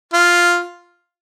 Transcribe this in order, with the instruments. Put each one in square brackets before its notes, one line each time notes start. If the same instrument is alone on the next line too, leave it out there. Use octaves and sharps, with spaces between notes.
[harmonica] F4